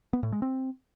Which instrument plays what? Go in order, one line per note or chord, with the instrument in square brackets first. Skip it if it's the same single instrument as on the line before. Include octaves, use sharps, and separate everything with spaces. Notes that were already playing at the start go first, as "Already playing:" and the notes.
[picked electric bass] B3
A2
G#3
C4